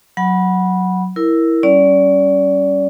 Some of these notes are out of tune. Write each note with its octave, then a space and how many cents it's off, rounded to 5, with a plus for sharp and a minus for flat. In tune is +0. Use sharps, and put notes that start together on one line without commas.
F#3 +0 F#5 +0 B5 -10
E4 +0 A#4 +0
G3 -35 C#4 +0 D5 -25